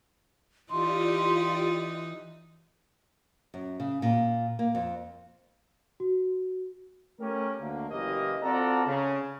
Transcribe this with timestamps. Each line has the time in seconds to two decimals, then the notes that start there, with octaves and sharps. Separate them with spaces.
0.71 E3 D#4 F4 G4 D5 C6
3.54 F#2
3.80 C#3
4.02 A#2
4.59 A#3
4.75 F2
6.00 F#4
7.20 A3 C#4 G4 A#4
7.60 D2 A#3
7.90 F#1 F#2 E3 A#3 G4 D#5
8.43 C4 F4 F#4 A4 D5 A#5
8.86 C#3